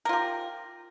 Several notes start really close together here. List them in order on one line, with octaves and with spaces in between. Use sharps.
A#4 F4 G4